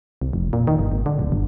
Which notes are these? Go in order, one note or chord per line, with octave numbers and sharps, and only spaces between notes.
C2
F1
A#2
D#3
G1
G#1
D3
D1
G1